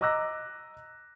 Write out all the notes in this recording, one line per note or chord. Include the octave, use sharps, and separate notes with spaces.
D#5 A#5 D6 E6 F#6 A#6